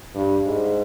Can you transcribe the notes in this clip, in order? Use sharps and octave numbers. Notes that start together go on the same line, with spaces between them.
G2
G#2